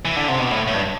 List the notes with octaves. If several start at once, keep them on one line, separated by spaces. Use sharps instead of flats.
E3
D3
C3
B2
A2
A2
G2